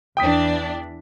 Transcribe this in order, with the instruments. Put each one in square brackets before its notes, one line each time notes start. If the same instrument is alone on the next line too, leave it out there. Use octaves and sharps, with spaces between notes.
[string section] E2 E3 D4 [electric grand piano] G5 D#6 B6